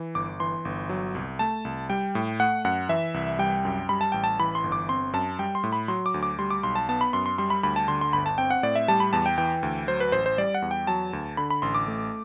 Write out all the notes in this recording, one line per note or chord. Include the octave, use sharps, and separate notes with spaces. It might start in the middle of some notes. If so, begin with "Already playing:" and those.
Already playing: E3
G1 D6
E3 C6
G1
F#3
C2
A3 A5
C2
G3 G5
A2
A3 F#5
F#2 F#5
E3 E5
C2
G3 G5
F#2
G3 B5
A5
A1 G5
A5
E3 B5
C6
G1
D6
C4 C6
F#2 A5
G3 G5
C6
A2
B5
F#3 C6
D6
D2
D6
G3 C6
D6
B1 C6
A5
B3 A5
B5
F#2 C6
C6
G3 C6
B5
D2 B5
A5
D3 C6
C6
G1 B5
A5
C4 G5
F#5
A2 D5
E5
G3 A5
B5
E2 A5
G5
E3 G5
D2
F#3 C5
B4
A1 C5
C5
G3 D5
F#5
E2
G5
F#3 A5
D2
D3 B5
B5
A1 C6
D6
A3